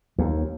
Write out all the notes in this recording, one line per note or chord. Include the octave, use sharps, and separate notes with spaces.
D#2